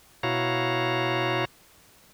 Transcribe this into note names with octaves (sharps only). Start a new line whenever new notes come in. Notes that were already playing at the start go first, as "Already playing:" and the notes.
B2 E4 F#4 C#5 F5 A#5